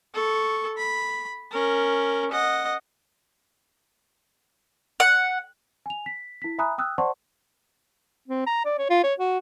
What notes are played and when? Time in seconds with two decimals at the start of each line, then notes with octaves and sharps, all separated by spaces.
0.14 A4 C#6
0.78 B5
1.51 C#4 A#4
2.31 D#5 F#5
5.00 F#5
5.86 G#5 F7
6.06 B6
6.42 E4 B6
6.58 E5 G#5 A#5 B5 D#6 F#6
6.78 G5 D#6 E6 F#6
6.98 C5 D5 F#5 A5 C6 C#6
8.28 C4
8.46 A#5
8.65 D5
8.78 C#5
8.90 F4
9.03 C#5
9.19 F#4